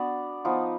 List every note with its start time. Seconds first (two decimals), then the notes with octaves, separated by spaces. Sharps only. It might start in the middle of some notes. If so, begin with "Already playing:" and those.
Already playing: B3 D4 F#4 D5
0.45 F3 B3 D#4